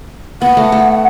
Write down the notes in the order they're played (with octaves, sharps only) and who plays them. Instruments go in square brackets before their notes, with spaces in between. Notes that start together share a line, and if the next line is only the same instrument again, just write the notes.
[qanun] B3 [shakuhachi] F#5
[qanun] A3
A3